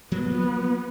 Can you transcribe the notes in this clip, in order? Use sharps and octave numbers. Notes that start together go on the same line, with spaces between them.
F3 F#3 A#3 B3